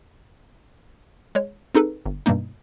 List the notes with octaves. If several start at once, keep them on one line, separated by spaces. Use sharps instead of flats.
G#3 C#5
C4 D#4 G#4 A4 B4
G1
G2 B2 G3 A#3 D#4